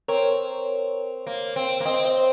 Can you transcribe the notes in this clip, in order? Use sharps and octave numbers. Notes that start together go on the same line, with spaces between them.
C4 A#4 C#5
A#3
C4
A#3
C4 C5 D#5
C5 D#5